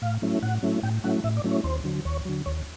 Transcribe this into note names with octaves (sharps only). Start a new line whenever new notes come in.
A2 F5
F#3 A3 C#4 E4
A2 F#5
F#3 A3 C#4 E4
A2 G5
F#3 A3 C#4 E4 F#5
A2 E5
D5
F#3 A3 C#4 E4
C#5
D#2 C5
D3 F#3
D#2 C#5
D3 F#3
D#2 C#5